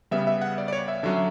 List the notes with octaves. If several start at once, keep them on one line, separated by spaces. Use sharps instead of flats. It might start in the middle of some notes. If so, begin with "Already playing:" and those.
C#3 G3 B3 E5
E5
F#5
D5
D5
C#5
E5
D3 F#3 C#4 E5